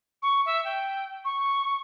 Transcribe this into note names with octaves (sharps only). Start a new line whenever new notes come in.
C#6
E5
G5
C#6